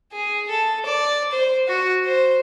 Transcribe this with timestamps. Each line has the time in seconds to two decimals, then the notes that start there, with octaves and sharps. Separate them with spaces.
0.13 G#4
0.49 A4
0.85 D5
1.31 C5
1.68 F#4
2.05 C5